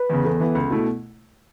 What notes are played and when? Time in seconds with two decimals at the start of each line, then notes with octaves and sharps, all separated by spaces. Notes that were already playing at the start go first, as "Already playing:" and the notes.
Already playing: B4
0.10 E2 C#3
0.25 E2 A4
0.40 E3 B3
0.55 C#2
0.70 B2 A3 E4